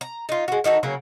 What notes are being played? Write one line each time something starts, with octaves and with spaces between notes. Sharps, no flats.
A#5
D#4 F4
G#3 F#4
D#3 D#4 F#4 A4
C#3 F#3 A#3 C#4